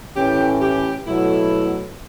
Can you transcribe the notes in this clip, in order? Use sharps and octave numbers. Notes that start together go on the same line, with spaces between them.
A2 E3 A3 C#4 G4
G4
B2 F#3 A3 E4